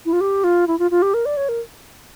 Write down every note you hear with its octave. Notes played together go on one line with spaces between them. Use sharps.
E4
F4
G4
F4
E4
F4
F4
G4
A#4
D5
C#5
A#4